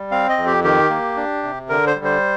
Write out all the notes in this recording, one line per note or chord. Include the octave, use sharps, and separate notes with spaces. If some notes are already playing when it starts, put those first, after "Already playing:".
Already playing: G3
C4 F5
D#5
F2
G4
D#3 G4
A#3
D4
C3
D3 A#4
C5
G3
C5